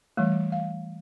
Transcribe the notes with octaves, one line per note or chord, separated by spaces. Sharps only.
E3 G3 A3
F5